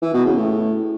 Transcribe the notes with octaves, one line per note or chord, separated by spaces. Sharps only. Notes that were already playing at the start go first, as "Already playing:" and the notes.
E3
B2
C#3
A2